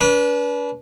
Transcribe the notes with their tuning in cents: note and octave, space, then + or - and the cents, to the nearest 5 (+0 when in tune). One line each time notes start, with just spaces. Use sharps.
D4 -40 B4 -25